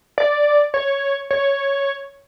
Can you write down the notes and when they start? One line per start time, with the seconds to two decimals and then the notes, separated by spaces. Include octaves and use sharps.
0.18 D5
0.74 C#5
1.31 C#5